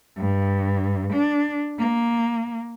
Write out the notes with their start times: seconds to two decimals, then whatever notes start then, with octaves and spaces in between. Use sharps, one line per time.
0.17 G2
1.12 D4
1.79 A#3